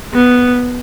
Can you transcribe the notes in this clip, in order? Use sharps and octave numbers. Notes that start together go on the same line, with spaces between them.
B3